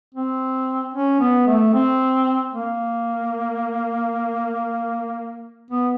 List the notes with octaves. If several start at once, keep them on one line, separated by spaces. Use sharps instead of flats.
C4
C#4
B3
A3
C4
A#3
B3